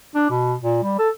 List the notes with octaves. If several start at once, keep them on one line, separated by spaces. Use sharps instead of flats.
D4
B2
A#2
G3
A4